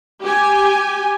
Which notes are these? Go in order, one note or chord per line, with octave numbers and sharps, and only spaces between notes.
G4 G#5